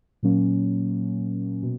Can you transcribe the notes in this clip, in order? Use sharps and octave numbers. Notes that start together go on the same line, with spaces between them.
A#2 F#3 A#3 C#4
B2